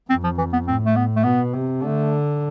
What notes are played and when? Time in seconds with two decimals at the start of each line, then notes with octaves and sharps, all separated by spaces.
0.10 F2 C4
0.24 F3
0.38 E3
0.53 B3
0.67 A2 C4
0.86 A3
0.96 B3
1.16 A3
1.24 B2 B3
1.53 C3
1.82 D3 A3